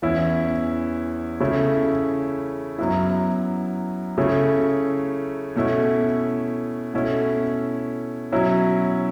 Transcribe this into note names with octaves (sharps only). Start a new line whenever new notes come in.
E2 E3 C#4 E4
C#3 A3 C#4 E4
F#2 F#3 B3 E4
C#3 A3 C#4 E4
B2 A3 C#4 E4
B2 A3 C#4 E4
B2 F#3 C#4 E4